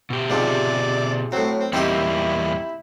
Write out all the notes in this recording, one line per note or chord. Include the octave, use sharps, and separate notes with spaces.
B2 G4
G#2 C3 F3 D5
A2 F#3 C4
C4
E2 G3 A#3 C4 D#4 E4 G4